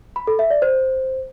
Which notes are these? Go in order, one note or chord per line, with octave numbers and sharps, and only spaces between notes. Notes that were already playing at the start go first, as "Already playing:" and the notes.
B5
A4
E5
D5
C5